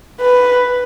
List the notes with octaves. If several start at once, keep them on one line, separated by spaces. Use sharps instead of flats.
B4